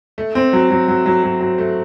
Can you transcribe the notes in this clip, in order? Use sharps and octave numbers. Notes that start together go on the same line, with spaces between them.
A3
C4
F#3
F#3
F#3
F#3
F#3
F#3
A3